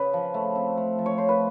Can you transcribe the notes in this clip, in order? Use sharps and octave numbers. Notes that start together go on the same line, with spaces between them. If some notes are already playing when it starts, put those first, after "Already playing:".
Already playing: C#3 B4
F3
A3
C4
A3
F3
C#5
A3 C5
B4